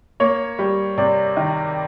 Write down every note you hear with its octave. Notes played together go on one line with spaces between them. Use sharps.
A#3 C#5
G3
C3 D5
D#3